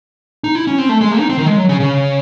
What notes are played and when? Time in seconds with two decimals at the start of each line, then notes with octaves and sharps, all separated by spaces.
0.44 D#4
0.55 E4
0.67 C#4
0.78 C4
0.89 A3
1.01 G#3
1.11 A3
1.20 D#4
1.29 C4
1.38 D#3
1.46 G#3
1.57 F#3
1.69 C#3
1.80 C#3